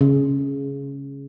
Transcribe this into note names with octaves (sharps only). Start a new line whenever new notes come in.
C#3